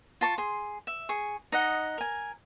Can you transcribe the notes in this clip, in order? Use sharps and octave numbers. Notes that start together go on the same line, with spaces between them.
F4 A5 C#6
G#4 C6
E5
G#4 C#6
D#4 D#5 F#5
A#4 G#5